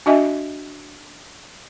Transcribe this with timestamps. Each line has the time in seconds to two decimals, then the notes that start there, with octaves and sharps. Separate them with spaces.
0.06 D4 F#4 D#5 E5 G#5